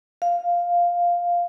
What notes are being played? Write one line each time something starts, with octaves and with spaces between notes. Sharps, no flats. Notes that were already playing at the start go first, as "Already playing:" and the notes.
F5